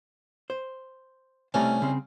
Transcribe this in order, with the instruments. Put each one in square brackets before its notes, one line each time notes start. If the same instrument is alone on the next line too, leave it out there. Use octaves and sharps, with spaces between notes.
[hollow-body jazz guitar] C5
[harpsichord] C2 C#4 [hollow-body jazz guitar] C3 A3 A#5
[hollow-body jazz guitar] C#3 C4